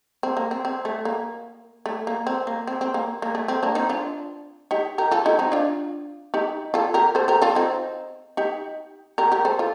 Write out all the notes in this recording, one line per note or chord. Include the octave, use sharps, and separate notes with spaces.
C4
A#3
C4
C4
A3
A#3
A3
A#3
C4
A#3
C4
C4
A#3
A#3
A3
C4
A#3 D4
C4 D#4
D4 F4
D#4 G4
G4 A#4
F4 A4
D#4 G4
C4 D#4
D4 F4
D#4 G4
F4 A4
G4 A#4
A4 C5
G4 A#4
F4 A4
C4 D#4
D#4 G4
G4 A#4
G4 A#4
A4 C5
F4